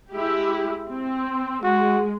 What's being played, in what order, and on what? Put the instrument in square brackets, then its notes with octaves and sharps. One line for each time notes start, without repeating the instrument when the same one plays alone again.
[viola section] G#3 E4 G4
C4
[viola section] G#3 [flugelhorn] F#4